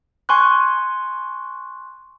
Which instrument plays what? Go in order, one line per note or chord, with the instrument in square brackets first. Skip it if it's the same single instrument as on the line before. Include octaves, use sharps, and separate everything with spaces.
[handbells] G#5 C6 C#6 F#6